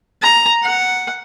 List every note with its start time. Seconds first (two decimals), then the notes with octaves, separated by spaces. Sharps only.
0.22 A#5
0.62 F#5